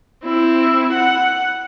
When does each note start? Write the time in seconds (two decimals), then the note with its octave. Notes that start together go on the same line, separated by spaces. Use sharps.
0.24 C4 E4
0.93 F#5